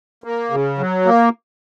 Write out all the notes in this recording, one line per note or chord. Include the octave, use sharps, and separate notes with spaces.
A#3
C#3
F#3
A#3